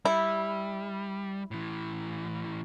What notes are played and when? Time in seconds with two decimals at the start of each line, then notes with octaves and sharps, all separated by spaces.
0.05 G3 E4
1.51 A2 E3